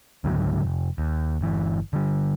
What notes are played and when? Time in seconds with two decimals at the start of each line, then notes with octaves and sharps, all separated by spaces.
0.24 C#2 G#2 D3 F#3
0.63 F1
0.98 D#2
1.41 G1 E3
1.93 D3 G3